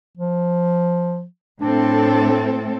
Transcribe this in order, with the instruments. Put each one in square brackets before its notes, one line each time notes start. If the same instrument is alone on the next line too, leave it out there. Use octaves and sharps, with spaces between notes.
[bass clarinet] F3
[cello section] A2 C4 A4 [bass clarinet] D4